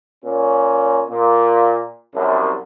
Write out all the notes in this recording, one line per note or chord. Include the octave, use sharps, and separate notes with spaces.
A#2 C#4
A#2
C2 F#2